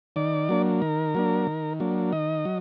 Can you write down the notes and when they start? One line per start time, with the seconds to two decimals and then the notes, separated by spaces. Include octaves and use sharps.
0.16 D#3 D5
0.49 F#3 A#3 D4
0.82 D#3 A#4
1.15 F#3 A#3 D4
1.47 D#3
1.80 F#3 A#3 D4
2.12 D#3 D#5
2.45 F#3